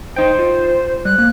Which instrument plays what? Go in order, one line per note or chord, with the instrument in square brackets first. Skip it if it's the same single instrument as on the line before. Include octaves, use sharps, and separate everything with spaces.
[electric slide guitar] D#4 G5 [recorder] C5
[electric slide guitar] F4
[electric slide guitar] G3 [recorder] F#6
[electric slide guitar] A#3